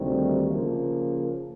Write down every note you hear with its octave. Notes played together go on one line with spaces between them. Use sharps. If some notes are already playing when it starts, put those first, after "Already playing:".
Already playing: D2 C3 D#3 G3
C#3 F3 A#3